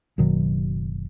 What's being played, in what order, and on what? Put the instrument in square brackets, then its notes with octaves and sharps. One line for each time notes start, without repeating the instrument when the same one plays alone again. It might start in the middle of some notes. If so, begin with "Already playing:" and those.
[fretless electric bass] F#1 B2 D#3 F#3